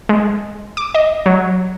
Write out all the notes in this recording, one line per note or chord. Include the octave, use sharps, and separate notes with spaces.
G#3
D6
D#5
F#3